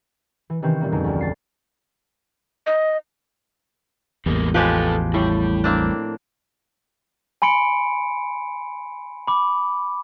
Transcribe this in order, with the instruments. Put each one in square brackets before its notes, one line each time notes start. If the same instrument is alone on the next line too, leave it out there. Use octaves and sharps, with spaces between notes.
[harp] E3
C3 D#3 E3 C4 C#4
A#2 G3 A#3
F2 D3 F#3 G#3 D#4
G#1 D2
A6 C7
[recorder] D#5
[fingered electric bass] A1 E2 [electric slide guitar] G3 G#3 A#3
[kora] F3 [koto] G#3 G4 B4 [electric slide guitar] F4 A4
[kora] A2 [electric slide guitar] G3
[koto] A#3 C4 D4
[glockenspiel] G#5 B5 C6 C#7 D7
B5 D6